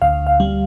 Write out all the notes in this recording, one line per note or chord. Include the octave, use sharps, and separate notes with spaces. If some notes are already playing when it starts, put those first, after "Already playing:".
D2 F5
F5
G3